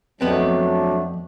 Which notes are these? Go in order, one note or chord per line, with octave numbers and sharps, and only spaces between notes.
F2 F#3 A3 B3 C4 D4